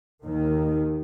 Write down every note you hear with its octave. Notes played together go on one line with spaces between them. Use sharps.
D#2 D#3